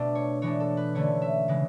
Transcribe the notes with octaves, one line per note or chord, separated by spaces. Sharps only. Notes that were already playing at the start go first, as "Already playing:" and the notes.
Already playing: B2 A3 D4
C#5
E3 G#3 D4 C#5
A4
B4
D3 A3 C#4 C#5
E5
C#3 E3 G#3